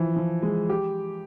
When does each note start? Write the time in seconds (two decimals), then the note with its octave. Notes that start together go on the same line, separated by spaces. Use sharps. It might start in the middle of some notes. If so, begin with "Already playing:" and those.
Already playing: E3 F3
0.16 F3
0.42 G#3
0.69 G4